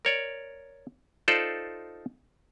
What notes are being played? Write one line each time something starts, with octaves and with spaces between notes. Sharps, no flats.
A#4 C#5 D5
D#4 F4 A4 C5 D5